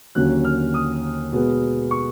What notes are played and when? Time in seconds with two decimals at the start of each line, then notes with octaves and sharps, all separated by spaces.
0.15 D#2 D3 F#3 A#3 C#4 F#6
0.45 F6
0.74 D#6
1.32 B2 G#3 B3
1.91 C#6